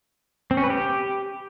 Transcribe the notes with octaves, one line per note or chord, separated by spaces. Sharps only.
C4
C#4
B4
G4